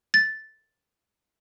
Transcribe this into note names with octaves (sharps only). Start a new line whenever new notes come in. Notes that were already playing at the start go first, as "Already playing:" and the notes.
A6